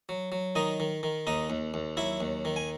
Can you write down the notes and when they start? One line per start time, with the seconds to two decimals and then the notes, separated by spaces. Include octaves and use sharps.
0.09 F#3
0.32 F#3
0.55 D#3 D#4 D#5
0.80 D#3
1.03 D#3
1.27 D#2 D#4 D#5
1.50 D#2
1.74 D#2
1.97 F#3 E4 E5
2.20 D#2
2.45 D#3
2.56 G#5